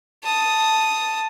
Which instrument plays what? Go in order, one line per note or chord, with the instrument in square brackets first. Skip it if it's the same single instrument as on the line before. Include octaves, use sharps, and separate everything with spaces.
[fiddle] A5 D#6